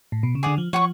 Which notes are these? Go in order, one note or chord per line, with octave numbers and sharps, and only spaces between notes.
A2
B2
C#3
D3 G#4 D5 F#5
F3
F3 C#5 F#5 C#6